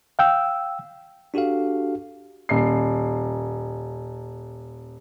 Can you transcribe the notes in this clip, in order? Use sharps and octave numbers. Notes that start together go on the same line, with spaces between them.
F5 G5 E6
D4 F#4 G4 A4 F5
D#1 C7